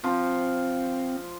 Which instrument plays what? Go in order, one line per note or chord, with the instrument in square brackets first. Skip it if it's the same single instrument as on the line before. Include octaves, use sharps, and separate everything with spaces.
[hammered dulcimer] F3 [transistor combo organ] C4